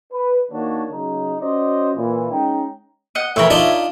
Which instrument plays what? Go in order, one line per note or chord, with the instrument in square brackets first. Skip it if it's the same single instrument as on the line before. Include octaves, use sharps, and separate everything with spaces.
[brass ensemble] B4
D#3 A#3 D4 F#4 C#5
C#3 F#3 D#4
C#4 F#4 C5 D5 D#5
A#2 E3
G#3 C#4 D#4 G5
[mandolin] D#5 F#5
[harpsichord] A2 E3 [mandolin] A#4 C#5 E5
[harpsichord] D4 D#4 F4